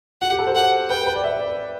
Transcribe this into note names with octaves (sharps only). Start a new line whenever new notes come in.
F#4 F#5
G4
A4
C5
F#5
B4 G5
B4
D5
E5
D5